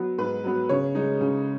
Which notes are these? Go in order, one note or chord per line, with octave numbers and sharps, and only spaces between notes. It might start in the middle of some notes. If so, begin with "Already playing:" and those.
Already playing: F#3 B3
G#2 B4
F#3 B3
C#3 C#5
G#3 D#4
C#3